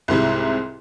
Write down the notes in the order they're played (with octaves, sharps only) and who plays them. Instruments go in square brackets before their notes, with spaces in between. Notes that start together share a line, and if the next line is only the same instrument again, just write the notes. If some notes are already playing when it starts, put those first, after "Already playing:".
[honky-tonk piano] C2 G#2 C3 E4